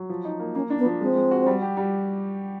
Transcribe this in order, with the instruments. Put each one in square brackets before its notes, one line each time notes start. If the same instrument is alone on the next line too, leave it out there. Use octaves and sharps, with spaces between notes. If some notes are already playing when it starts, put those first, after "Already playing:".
Already playing: [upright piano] F#3
F3
D#4
A#3
[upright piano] A#3 [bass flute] C#4
[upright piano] D4
[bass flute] B3
[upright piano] F3
[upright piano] G#3 [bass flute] C4
[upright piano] G#3
F#4
G3
G4
G3